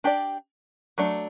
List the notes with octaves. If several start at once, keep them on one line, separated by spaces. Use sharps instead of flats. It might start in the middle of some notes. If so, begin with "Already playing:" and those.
D4 G4 D5
F#3 A3 D4